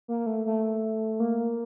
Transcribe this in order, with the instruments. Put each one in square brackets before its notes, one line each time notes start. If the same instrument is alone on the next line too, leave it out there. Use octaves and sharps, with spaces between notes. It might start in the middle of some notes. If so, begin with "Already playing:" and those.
[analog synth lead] A#3
A3
A3
A#3